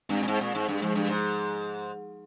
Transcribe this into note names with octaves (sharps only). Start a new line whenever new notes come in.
G2 G#3 C4
A#2
G#2
A#2
G#2
G2
G#2 F3 G#3
G2
G#2